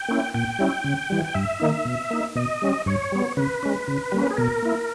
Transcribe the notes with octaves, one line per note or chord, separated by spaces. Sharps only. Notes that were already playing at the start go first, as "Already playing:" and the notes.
Already playing: G5
A#3 C#4 E4
A#2 G5
G3 C#4 E4
C#3
E3 G3
G5
G2 E5
D#3 A#3 D#4
B2
A#3 D#4
B2 D#5
G3 C#4
G2 C#5
G3 B3
C#3 B4
G#3 C#4
C#3
G3 A#3 C#4
G#4
B2 A#4
A#3 E4